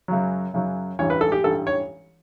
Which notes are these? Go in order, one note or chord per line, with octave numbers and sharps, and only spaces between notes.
F#2 C#3 F#3
F#2 C#3 F#3
A1 G2 E3 C#5
B4
A4
G4
A1 G2 E3 A4
C#5